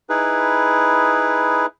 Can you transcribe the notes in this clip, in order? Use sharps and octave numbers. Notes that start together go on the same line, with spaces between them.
D#4 E4 G#4 B4